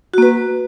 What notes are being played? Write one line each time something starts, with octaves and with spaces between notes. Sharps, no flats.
A#3 F#4 B4